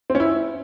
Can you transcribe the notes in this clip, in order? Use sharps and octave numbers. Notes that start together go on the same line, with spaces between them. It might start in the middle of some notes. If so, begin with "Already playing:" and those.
C4
C#4
E4